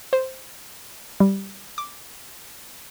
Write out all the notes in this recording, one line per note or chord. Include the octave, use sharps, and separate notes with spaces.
C5
G3
D6